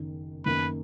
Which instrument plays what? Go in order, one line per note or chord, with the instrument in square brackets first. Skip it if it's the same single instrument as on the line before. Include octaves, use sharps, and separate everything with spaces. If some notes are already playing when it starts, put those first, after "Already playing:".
Already playing: [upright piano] F#1 F#2 D#3
[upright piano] F#2 D#3 A#3 [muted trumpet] B4